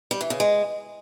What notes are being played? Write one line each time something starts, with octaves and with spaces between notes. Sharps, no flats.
G3
E3
C#3
G#3